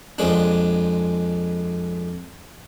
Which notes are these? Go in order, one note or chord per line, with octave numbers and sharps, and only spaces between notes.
F2 G#3 D4